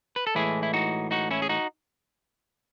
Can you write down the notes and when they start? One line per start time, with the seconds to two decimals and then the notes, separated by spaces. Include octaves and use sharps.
0.16 B4
0.27 A4
0.35 A2 E3 G#3 E4 G#4
0.63 E4
0.74 D#4 F#4
1.11 D#4 F#4
1.31 C#4 E4
1.42 G#4
1.49 D#4 F#4